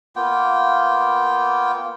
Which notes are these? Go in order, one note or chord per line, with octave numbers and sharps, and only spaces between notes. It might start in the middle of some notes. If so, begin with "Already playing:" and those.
A#3 B3 F4 G5